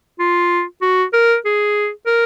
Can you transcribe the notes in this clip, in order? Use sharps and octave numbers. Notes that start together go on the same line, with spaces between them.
F4
F#4
A#4
G#4
A#4